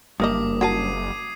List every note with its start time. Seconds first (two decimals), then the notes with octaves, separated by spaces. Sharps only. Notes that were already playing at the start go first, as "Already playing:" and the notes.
0.20 F#1 G2 E3 A#3 D#5 D6 D#6
0.61 F#4 A#4 A5 G#6 C7 D#7